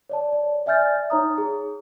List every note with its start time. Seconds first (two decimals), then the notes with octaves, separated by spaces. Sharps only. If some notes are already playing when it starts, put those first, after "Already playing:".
0.09 C#5 D5 A5
0.33 D5
0.66 D5 E5 G#5 F6 G6 A6
1.10 D#4 C#5 A#5 D#6
1.38 G#4